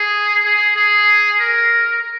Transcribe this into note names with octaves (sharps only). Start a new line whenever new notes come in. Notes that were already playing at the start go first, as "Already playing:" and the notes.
Already playing: G#4
G#4
G#4
A#4